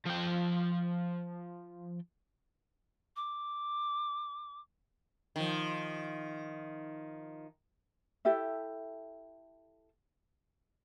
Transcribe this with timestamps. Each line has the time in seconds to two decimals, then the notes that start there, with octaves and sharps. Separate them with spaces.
0.05 F3 G5
3.16 D6
5.36 D#3 F3
8.25 E4 G4 A4 E5